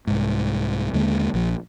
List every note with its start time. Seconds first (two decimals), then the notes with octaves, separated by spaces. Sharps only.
0.07 C2 G#2
0.93 D#2 D3 G#3 A#3
1.34 A#1 F3